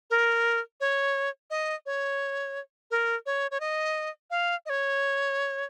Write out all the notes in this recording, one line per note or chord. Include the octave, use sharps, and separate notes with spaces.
A#4
C#5
D#5
C#5
A#4
C#5
C#5
D#5
F5
D#5
C#5